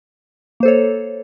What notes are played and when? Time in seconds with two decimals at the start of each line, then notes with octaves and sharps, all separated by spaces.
0.60 A#3
0.63 C5
0.65 A4
0.68 C#5